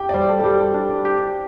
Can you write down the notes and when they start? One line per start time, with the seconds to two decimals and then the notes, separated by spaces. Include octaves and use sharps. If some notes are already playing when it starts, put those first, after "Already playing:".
Already playing: G4 G5
0.09 D5
0.14 G3 C5
0.29 A4
0.39 A4
0.43 G3 G4
0.60 A4
0.74 D4
1.05 G4